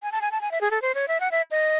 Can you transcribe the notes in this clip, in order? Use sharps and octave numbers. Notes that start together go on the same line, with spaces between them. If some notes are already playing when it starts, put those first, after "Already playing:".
G#5
A5
G#5
A5
G#5
E5
G#4
A4
C5
C#5
E5
F#5
E5
D#5